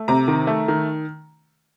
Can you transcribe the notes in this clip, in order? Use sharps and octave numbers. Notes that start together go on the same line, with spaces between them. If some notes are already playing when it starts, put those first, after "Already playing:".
Already playing: A3
C3 A#5
D#3
A3
D#3